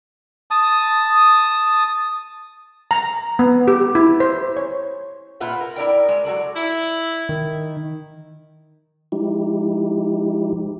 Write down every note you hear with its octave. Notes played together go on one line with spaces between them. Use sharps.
A5 D#6
A#5
B3
G4
E4
C5
C#5
A#2 F4 B4 E5 F#5
A#4
E4 A#4 D5 G5
G#3
F#3 F#4 A4 D5
E4
D#3
F3 G#3 D#4 E4 G4